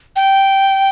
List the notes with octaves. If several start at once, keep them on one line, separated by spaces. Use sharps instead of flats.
G5